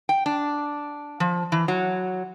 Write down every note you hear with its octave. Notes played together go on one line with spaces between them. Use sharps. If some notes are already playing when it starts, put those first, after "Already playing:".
G5
D4
F3
E3
F#3